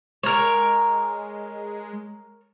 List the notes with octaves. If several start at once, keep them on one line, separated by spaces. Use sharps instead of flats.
G#3 A#4 C#5